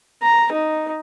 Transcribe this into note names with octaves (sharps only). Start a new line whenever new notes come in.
A#5
D#4